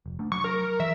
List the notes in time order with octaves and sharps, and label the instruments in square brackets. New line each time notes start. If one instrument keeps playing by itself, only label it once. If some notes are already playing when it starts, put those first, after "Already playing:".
[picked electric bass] F1
A3 D4
[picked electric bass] F#3 [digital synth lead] C#6
[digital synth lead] A#4
[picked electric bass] E3 [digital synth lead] E5